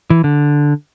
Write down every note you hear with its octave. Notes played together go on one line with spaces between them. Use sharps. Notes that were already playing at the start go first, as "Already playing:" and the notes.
E3
D3